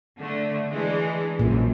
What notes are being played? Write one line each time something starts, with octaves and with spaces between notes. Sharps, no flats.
D3 A3
E3 G#3 D4
A#1 F#2 A#2